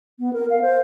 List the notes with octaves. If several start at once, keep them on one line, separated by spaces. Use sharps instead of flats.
B3
A#4
F5
C5